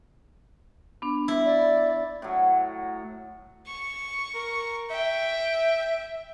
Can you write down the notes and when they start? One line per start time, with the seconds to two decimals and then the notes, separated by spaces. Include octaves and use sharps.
1.02 B3 D4
1.28 E4
1.45 D5
2.22 A2 F#3
3.67 C#6
4.35 A#4
4.91 E5 G5